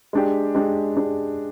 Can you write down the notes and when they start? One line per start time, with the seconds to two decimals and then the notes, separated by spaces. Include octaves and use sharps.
0.13 G#3 D4 G4
0.55 G#3 D4 G4
0.97 G#3 D4 G4